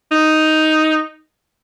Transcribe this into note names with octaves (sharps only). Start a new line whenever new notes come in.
D#4